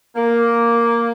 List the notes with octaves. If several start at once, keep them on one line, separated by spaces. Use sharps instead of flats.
A#3